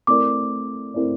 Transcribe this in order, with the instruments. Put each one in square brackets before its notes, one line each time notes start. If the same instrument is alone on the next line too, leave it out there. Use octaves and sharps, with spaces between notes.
[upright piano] A3 C4 E4 A#4 D5 [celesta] D6
[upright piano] A3 C4 E4 A#4 D5